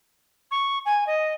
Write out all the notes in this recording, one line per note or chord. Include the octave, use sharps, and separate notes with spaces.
C#6
G#5
D#5